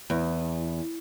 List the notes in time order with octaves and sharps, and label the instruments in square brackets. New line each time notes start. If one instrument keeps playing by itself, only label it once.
[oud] E2